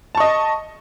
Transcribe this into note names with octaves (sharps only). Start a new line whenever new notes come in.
D#5 A5 C#6